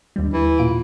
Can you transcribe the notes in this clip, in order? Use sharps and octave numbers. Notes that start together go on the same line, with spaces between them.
D#2 D3 G3
E3
A#2 F4 D7